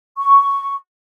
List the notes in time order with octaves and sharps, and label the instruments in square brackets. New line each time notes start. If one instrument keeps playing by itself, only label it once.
[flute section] C#6